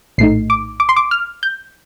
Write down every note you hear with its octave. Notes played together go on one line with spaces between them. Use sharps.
A#1 A2 A3 D#4 C7
D6
D6
C6
D6
F6
G6